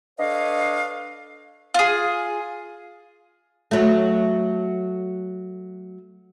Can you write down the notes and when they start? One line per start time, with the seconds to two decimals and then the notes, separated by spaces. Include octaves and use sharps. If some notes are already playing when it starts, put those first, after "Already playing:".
0.18 D4 A4 B4 C#5 D#5 F5
1.74 F4 G#4
3.71 F#3 A3